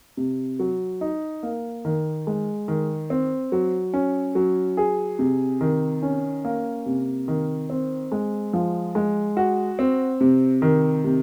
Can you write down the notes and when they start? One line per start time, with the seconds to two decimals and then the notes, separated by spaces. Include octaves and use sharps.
0.17 C3
0.59 F#3
1.01 D#4
1.43 A#3
1.85 D#3
2.27 G#3
2.68 D#3
3.10 C4
3.52 F#3
3.94 C#4
4.35 F#3
4.77 G#4
5.19 C3
5.61 D#3
6.03 C#4
6.45 A#3
6.86 C3
7.28 D#3
7.70 C4
8.12 G#3
8.53 F3
8.95 G#3
9.37 F#4
9.79 C4
10.21 C3
10.62 D#3
11.04 C3